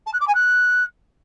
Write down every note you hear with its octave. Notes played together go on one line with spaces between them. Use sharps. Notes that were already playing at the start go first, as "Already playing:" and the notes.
A5
F#6
D6
G#5
F#6